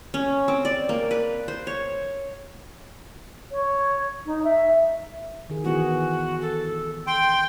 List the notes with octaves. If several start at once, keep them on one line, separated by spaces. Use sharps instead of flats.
C#4
C4
D5
A#3
B4
C5
C#5
C#5
D#4
E5
D#3 G#4
E3 B3 F#4 G#4
A4
G5 C6